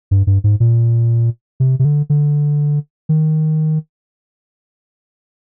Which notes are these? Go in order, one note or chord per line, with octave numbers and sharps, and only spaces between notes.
G2
G2
G#2
A#2
C3
C3
D3
D3
D#3